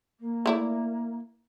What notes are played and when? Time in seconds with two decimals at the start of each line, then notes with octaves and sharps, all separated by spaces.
0.19 A#3
0.46 A3 E4 D5